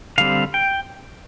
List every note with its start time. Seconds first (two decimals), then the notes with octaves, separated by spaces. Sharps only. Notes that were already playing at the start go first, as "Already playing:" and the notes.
0.18 D3 G3 C4 F5
0.54 G5